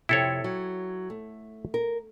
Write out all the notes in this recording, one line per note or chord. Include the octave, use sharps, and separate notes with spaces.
F2 C3 E4 A4 C#5
F#3
A3
A#4